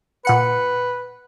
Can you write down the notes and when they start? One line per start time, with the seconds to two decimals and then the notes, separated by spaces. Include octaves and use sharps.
0.25 A#2 B4 F#5 C#7